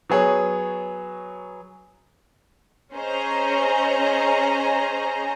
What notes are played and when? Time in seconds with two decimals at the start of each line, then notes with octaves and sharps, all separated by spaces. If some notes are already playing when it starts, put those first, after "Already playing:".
0.10 F#3 B3 G#4 C#5
2.93 C#4 G#4 C5 D#5 A#5